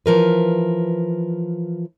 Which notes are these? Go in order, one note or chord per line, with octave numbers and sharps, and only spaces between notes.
E3 F3 A#4 B4